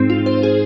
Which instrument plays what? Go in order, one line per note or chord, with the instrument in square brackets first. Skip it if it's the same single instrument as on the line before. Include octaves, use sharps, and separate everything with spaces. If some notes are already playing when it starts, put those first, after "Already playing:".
Already playing: [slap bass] G#2 [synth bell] C4
[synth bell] F4
C5
G#4